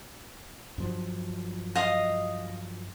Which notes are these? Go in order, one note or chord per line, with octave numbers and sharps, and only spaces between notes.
G2 F3 F#3
D#5 F5 D#6